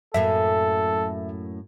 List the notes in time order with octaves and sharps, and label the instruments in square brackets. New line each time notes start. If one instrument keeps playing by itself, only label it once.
[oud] F#2 A2 A#3 [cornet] A4 [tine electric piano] E5